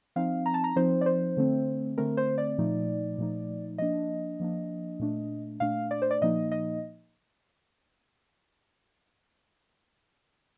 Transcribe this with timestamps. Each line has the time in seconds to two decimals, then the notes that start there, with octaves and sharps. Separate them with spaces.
0.16 F3 C4 D#4 F5
0.46 A#5
0.54 A5
0.64 A#5
0.76 F3 C4 D#4 C5
1.01 D5
1.06 C5
1.37 D3 A3 C4
1.98 D3 A3 C4 A#4
2.17 C5
2.38 D5
2.58 A#2 F3 A3 D#4
3.18 A#2 F3 A3 D#4
3.78 F3 A#3 D4 D#5
4.40 F3 A#3 D4
5.00 A#2 A3 D4
5.60 A#2 A3 D4 F5
5.91 D5
6.02 C5
6.11 D5
6.21 A#2 F3 A#3 D#4 D#5
6.52 D#5